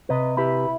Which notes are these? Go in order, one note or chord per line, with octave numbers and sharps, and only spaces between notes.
C3 B4 D#5
E4 G4 B4